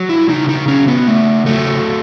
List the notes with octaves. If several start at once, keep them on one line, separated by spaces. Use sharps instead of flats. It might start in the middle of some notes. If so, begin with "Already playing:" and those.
Already playing: F#3
E4
C#3 D#4
D#4
F#3 C#4
B3
C#3 A3
F#3 A3